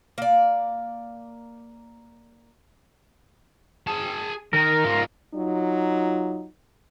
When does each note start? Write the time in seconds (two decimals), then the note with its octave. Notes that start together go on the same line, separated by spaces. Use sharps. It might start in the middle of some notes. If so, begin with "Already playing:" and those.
0.18 A#3 D5
3.87 G#4 A5
4.53 D#3 A#4
4.84 G#2 F4
5.35 F#3 D#4 F4